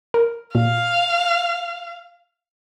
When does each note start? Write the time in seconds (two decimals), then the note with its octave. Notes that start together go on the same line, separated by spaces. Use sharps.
0.14 A#4
0.55 A#2 F5